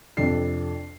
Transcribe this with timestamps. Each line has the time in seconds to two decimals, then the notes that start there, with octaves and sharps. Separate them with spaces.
0.17 F2 C3 D4 A4 C7